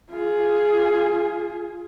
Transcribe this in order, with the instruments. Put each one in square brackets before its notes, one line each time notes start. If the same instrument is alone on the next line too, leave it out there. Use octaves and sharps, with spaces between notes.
[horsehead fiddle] F4 G#4